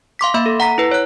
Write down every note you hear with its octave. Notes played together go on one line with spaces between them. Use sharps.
F5 C6 D6 B6
A#3 E5 B5
A4
F#5 A#5 B6
E4 B4
C#5 F#6